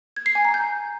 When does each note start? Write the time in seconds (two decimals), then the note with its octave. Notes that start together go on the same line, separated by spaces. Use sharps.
0.16 G#6
0.26 C7
0.35 G#5
0.45 A#5
0.54 G6